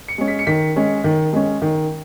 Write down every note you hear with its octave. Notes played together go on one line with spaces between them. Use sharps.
C#7
G#3 C#4
B6
C#7
D#3 B6
G#3 C#4
D#3
G#3 C#4
D#3